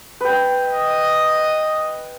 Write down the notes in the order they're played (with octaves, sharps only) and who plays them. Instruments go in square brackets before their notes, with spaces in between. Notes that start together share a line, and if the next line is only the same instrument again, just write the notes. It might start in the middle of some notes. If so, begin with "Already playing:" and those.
[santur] B4 G5
[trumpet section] D#5